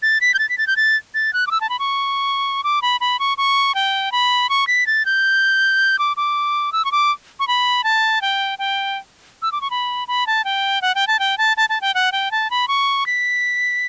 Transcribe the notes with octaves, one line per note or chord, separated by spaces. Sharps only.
A6
B6
G6
A6
B6
A6
G6
A6
A6
F#6
D6
E6
A5
B5
C#6
D6
B5
B5
C#6
C#6
G5
B5
C#6
B6
A6
G6
D6
D6
E6
C#6
D6
C#6
B5
A5
G5
G5
E6
D6
C#6
B5
B5
A5
G5
F#5
G5
A5
G5
A5
A5
A5
G5
F#5
G5
A5
B5
C#6
B6